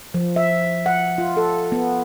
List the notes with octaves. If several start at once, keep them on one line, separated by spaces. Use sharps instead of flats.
F3
E5
F#5
F4
A4
B3